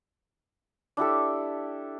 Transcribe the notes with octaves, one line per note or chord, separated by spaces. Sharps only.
D4 E4 G4 A4